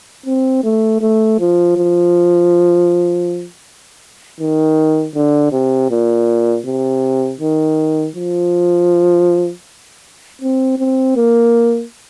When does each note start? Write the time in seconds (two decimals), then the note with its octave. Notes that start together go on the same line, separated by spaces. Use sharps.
0.26 C4
0.64 A3
1.02 A3
1.39 F3
1.77 F3
4.40 D#3
5.15 D3
5.52 C3
5.91 A#2
6.66 C3
7.40 D#3
8.16 F3
10.42 C4
10.79 C4
11.16 A#3